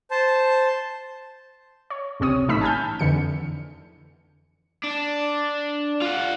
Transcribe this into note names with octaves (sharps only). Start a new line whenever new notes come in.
C5 A5
C#5
G#1 C#2 C3 C4 C#5 D#6
A1 A3 D#4 B5 E6 B6
G#5 A5 F6 G6
F2 D3 E3 C#7
D4
F4 F#5